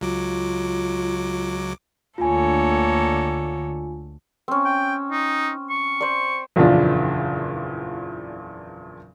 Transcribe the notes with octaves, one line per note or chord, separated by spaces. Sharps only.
C#2 F#3 F4 D6
D2 D3 A#3 F4 A4 C#5 G#5
C4 C#4
G5
D#4
C#6
C5 D5
F#1 E2 A#2 F3 D4